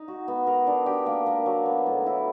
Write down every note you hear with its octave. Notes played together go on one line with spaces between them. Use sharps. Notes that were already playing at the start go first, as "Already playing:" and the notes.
Already playing: D#4
F#4
B3
A#4
D4
G4
A#3
A#3
F#3
B3
A2
E4